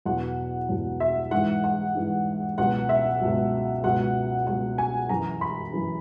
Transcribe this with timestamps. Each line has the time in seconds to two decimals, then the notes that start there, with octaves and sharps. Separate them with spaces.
0.05 E2 B2 F#3 F#5
0.69 E2 B2 F#3
1.00 E5
1.31 G#2 E3 F#5
1.64 F#5
1.95 G#2 E3
2.58 C#2 B2 F#3 F#5
2.89 E5
3.20 C#2 B2 F#3
3.84 C#2 B2 F#3 F#5
4.47 C#2 B2 F#3 F#5
4.78 G#5
5.09 F#2 E3 A#5
5.41 B5
5.73 F#2 E3